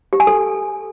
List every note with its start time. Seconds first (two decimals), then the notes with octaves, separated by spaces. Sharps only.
0.13 G4
0.20 G#5
0.27 A4